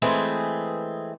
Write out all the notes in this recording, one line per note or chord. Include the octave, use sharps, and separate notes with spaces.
E3 G#3 A3 C4 G#4 B4